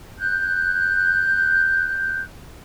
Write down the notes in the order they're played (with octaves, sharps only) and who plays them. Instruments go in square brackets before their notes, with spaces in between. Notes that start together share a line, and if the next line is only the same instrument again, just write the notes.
[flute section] F#6 G6